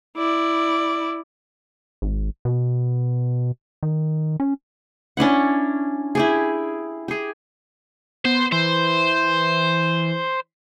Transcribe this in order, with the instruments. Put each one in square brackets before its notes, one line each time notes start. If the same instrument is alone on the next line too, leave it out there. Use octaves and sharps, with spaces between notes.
[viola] E4 D5
[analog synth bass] G#1
B2
D#3
C#4
[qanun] C#4 D4 E4 F#5
E4 G4 G#4
G4 G#4
[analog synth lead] B3 [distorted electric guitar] C5
[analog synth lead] E3 [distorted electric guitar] C5